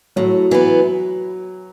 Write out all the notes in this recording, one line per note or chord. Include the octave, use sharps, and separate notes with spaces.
A2 F#3
E3 B3